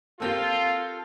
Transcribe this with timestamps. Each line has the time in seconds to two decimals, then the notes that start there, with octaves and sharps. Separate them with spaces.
0.20 A#3 C4 F4 G4 A4